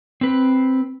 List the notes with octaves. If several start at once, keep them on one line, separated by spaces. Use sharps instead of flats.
C4 B4